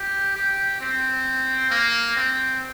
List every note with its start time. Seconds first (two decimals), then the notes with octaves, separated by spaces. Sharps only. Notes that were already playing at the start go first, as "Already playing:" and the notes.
Already playing: G4
0.36 G4
0.81 C4
1.70 A#3
2.16 C4